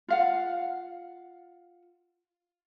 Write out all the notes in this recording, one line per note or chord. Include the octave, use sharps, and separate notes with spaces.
F4 F5 F#5